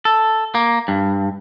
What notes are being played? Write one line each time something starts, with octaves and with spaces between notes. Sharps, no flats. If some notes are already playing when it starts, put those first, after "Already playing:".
A4
A#3
G2